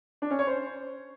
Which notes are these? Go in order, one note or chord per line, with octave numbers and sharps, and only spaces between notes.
D4
C#4
C#5
C5